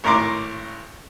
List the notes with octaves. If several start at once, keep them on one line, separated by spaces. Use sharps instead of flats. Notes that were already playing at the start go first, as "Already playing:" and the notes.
G#1 A2 A#4 A#5 C6 D6